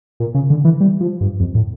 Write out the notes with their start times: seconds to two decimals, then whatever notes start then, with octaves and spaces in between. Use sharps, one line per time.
0.20 A#2
0.35 C#3
0.50 D3
0.65 E3
0.80 G3
1.01 F3
1.21 G2
1.40 F2
1.55 A2